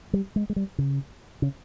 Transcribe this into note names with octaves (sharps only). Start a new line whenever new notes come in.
G3
G#3
G#3
G3
C#3
C#3